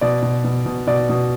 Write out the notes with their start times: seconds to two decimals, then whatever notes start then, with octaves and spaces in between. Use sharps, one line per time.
0.01 B2 D5
0.22 B2
0.44 B2
0.66 B2
0.87 B2 D5
1.09 B2